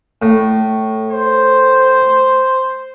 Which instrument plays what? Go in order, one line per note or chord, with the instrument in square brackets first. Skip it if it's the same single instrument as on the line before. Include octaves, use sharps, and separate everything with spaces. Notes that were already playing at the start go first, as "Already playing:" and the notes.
[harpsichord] A2
[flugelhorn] C5